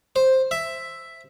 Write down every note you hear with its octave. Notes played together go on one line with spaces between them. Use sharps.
C5
E5